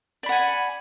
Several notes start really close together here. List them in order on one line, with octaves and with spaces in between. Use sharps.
D5 B5 F#5 G#5